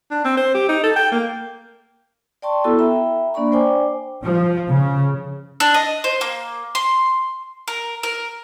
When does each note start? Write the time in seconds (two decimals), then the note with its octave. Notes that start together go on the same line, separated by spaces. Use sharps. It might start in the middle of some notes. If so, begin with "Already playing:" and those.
0.11 D4
0.25 C4
0.37 C5
0.55 G4
0.69 D#4
0.84 A4
0.96 G5
1.12 A#3
2.42 D5 G5 A5 C6 C#6
2.64 B3 E4 F#4 A4 E6
2.79 E5 G5 A#5 B5
3.34 A#3 D4 D5 A#5 B5 C#6
3.52 C5 D5 G5 G#5 D6
4.23 F3
4.68 C#3
5.60 D4
5.74 D#5
6.04 C5
6.21 A#3
6.75 C6
7.68 A#4
8.03 A#4